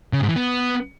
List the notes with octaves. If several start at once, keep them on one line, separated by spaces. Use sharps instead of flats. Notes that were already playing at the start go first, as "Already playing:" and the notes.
C#3
G#2
E3
B3